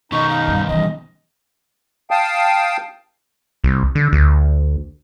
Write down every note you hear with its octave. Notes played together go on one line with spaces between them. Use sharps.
B2 D#3 D#4 C#6
F5
G2 G3
E3 G3 D#5
F5 G5 A5 D#6
C2
D3
D2